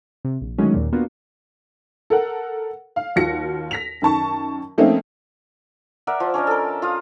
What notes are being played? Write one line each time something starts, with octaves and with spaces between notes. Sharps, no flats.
C3
A#1
D3 D#3 F#3 G#3 A3 C#4
D#2 A#2
A#3 B3 D4 F4 F#4
A4 A#4 F#5
F5
D#2 F4 F#4 A#6 C#7
A#6 B6 F7
F#2 D#3 A5 C#6
F3 A3 A#3 C4 C#4 D#4
A#4 D5 E5 F#5
F3
C#4 D4 C#5 D#5
A4 A#4
F4 F5 D#6